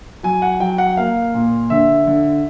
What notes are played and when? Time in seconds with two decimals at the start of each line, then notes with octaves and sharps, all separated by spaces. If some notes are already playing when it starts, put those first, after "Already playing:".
0.23 F#3 G#5
0.42 F#5
0.60 F#3 G5
0.78 F#5
0.97 A#3 F5
1.34 A#2
1.70 D3 E5
2.07 D3